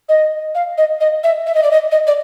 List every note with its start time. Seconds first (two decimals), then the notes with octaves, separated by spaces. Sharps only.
0.09 D#5
0.55 F5
0.78 D#5
1.00 D#5
1.23 E5
1.46 E5
1.55 D#5
1.63 D5
1.71 D#5
1.91 D#5
2.07 D5